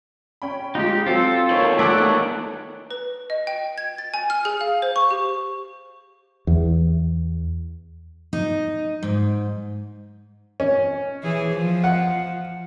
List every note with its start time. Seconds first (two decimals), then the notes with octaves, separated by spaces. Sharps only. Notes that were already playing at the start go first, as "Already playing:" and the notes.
0.42 C#4 G5 B5
0.75 G#3 D#4 F4 G4
1.06 F#3 C4 F4 A4
1.50 E2 D#3 C#5
1.79 A3 A4 D5 F#5 E6
2.91 B4
3.30 D#5
3.47 G5
3.78 G#6
3.98 A6
4.14 G#5
4.30 F6
4.45 G#4
4.61 F5
4.82 C5
4.96 C#6
5.11 G4
6.47 E2
8.33 D#4
9.03 G#2
10.60 C#4
11.23 E3 G#4
11.53 F3
11.84 F#5